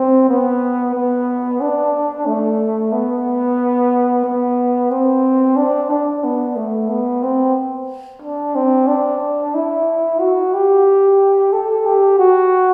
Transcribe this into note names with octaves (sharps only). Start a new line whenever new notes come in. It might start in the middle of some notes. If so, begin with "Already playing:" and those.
Already playing: C4
B3
B3
D4
A3
B3
B3
C4
D4
D4
B3
A3
B3
C4
D4
C4
D4
E4
F#4
G4
A4
G4
F#4